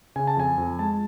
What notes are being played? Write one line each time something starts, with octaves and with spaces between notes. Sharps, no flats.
C#3 G#5
A5
F2 G#5
F2
G#3 A5